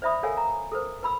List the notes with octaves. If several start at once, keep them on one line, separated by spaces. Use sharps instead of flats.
C5 D5 E5 B5 D#6
A4 A#4 C#5 F5 F#5 G#5
A#5
A4 A#4 C5
B4 B5 E6